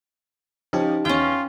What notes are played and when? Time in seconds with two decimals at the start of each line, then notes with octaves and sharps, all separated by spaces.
0.73 F3 C#4 D#4 G4
1.05 E2 C#4 F4 G5